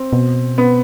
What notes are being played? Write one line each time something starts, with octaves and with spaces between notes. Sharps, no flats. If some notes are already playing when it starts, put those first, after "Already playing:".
Already playing: C4
B2
B3